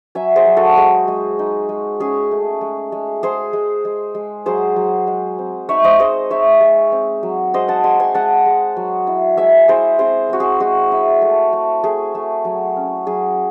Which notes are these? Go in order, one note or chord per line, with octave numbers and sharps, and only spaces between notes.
F#3 E5 G#5
G#4 C5
F#3
F#4 A4
G#3 G#4
G#3
D#4
G#3
C#4 G#4
A3
G#3
G#3
G#3 G#4 C5
G#3
G#3
G#3
F#3 G#4 C5
F#3
G#3
C4
D#4 C#5 E5
C5 D#5
G#3 C5 D#5
D#4 C#5 E5
G#3
C4
F#3
G#3 C5 D#5
F#5 A5
G#3 G#5 C6
G#5 C6
G#3 F#5 A5
G#3
F#3
E4
G#3 E5 G#5
E4 G#4 C5
C4 G#4 C5
C4 F#4
G#4
G#3 F#4
E4
A3
A3
A3 G#4
A3
F#3
C#4
F#3 G#4